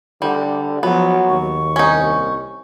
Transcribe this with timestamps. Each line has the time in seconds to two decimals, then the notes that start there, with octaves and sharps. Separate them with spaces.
0.22 D3 G3
0.83 F3 F#3 B3
1.29 D#2 C#6
1.76 C2 C#4 D#4